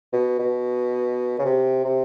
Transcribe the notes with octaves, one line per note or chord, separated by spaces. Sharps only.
B2
B2
C#3
C3
C3